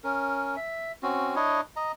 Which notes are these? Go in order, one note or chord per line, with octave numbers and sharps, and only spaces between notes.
C#4 A#4
E5
C4 C#4 F#4
D4 E4 C#5 D#5
D#5 A#5